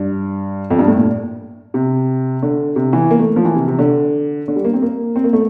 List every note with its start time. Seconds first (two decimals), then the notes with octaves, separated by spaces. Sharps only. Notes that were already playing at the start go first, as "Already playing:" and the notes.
Already playing: G2
0.70 F2
0.79 G2
0.88 A2
0.97 A#2
1.74 C3
2.42 D3
2.76 C3
2.93 E3
3.11 A#3
3.19 A3
3.36 F3
3.45 E3
3.56 C3
3.68 C3
3.78 D3
4.48 D3
4.56 G3
4.65 A#3
4.74 C4
4.82 A#3
5.16 C4
5.24 A#3
5.33 A3